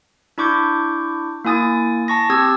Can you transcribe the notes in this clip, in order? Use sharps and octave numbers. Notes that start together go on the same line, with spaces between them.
D4 E4 C#6 D6 G6
A#3 E4 G#5 D#6 A6
A5 C#6 A#6
C4 G4 D#6 E6 G#6